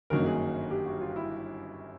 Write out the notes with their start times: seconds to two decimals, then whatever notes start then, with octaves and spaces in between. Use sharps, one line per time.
0.10 G1 F#2 D#3 F#3 A#3 A#4
0.26 G#4
0.71 G4
0.86 F#4
1.01 F4
1.16 E4